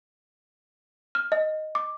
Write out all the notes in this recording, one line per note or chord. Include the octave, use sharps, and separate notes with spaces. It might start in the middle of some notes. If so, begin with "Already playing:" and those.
F6
D#5
D6